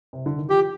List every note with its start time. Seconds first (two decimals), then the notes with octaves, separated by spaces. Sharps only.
0.13 C3
0.26 D3
0.38 D#3
0.50 F3 G4